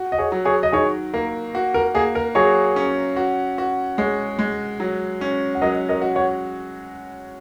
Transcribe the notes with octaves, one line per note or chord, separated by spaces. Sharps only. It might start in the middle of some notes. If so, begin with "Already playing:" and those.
Already playing: F#4
D#5
G#4 C#5
F#3
G#4 C#5
D#5
D#3 G#4 C#5
A#3 A#4
F#4
A#4
A#3 G#4
A#4
F#3 G#4 C#5
C#4
F#4
F#4
G#3 G#4 C#5
G#3
F#3
C#4
F#5
F#3 A#4 D#5
A#4 D#5
F#4
C#5 F#5